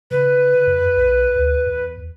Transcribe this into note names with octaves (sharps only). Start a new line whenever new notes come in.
C#3 B4
F2
B1
D2
E2